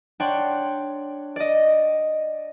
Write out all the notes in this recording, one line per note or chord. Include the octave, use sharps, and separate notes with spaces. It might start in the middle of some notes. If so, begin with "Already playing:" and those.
D4 C#5 D5 F#5 G5 C6
D5 D#5